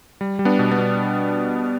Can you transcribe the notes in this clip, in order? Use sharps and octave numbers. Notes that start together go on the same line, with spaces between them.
G3
G3
B3 D4
B2
B3
B2